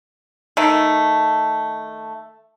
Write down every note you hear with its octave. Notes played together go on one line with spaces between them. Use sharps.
D#3 A3